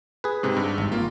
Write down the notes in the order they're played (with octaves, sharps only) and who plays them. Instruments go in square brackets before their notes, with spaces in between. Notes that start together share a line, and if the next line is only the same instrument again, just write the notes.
[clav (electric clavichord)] G#4 B4
[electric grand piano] G#2 C3
G2
[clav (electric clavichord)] G#1
[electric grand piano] A#3 F4